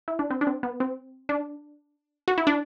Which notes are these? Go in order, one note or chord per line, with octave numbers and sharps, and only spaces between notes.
E4
D4
C4
D4
C4
B3
C4
D4
F#4
E4
D4